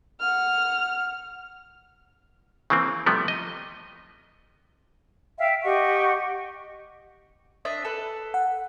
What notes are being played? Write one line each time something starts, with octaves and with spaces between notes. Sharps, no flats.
F#5 F6
C#3 E3 A#3 C4
C3 F3 G3 A3 B3
D#5
E5 F5 G5
G4 D#5 F#5 C#6
D4 D#5 E5
A4 B4
F#5